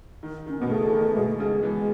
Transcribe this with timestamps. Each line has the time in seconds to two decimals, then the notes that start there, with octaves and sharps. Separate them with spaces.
0.23 D#3
0.46 D#3 C#4
0.59 B2 B3
0.69 C#3 A3
0.86 E3
0.92 D#3
1.16 B2 G#3
1.26 A3
1.36 C#3 G#3
1.63 E3 G#3